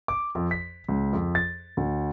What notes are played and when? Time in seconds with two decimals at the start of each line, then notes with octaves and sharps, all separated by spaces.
0.08 D6
0.35 F2
0.51 B6
0.89 C#2
1.13 F2
1.35 A6
1.77 D2